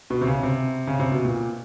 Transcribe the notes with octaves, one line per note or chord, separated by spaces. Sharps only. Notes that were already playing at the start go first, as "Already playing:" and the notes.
B2
C3
C#3
C3
C#3
C3
B2
A#2